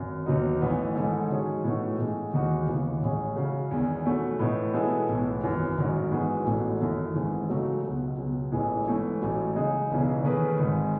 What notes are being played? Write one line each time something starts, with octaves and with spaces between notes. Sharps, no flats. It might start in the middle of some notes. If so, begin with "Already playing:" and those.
Already playing: G#1 F#2
D#2 D#3 F#3 B3 D#4
A1 A2 E3 B3
G#2 D#3 G#3 D#4 A4
D#3 F#3 C#4 G#4
A2 E3 A3 D#4 F#4
A2 G#3 D#4
D#2 D#3 G#3 D#4 F#4
D#2 C#3 E3 B3
A1 A2 G#3 C#4 G#4
C#3 F#3 C#4 F#4
E2 D#3 G#3
B2 A3 C#4 F#4
A2 E3 B3 D#4
B2 G#3 B3 E4 A4
B1 A2 E3
G#1 F#2 E3
A1 G#2 D#3 F#3 C#4
G#2 E3 G#3 B3 F#4
A1 A2 F#3 A3
F#2 D#3 A3 E4
G#1 G#2 E3 G#3
C#3 F#3 A3 D#4 F#4
C#2 B2 F#3
C#2 B2 F#3
A1 A2 E3 G#3
G#2 E3 A3 C#4
A1 A2 F#3
C#3 G#3 D#4
E1 E2 C#3 E3
D#3 A3 C#4 G#4 B4
G#1 G#2 D#3 G#3